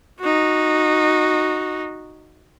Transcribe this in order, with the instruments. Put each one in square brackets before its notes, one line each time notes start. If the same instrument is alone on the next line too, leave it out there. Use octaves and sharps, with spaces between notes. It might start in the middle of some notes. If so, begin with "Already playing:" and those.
[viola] D#4 F#4